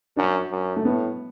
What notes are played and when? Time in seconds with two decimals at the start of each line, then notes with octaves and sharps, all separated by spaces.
0.17 F#2 D4
0.51 F#2
0.76 A3
0.85 A2 B3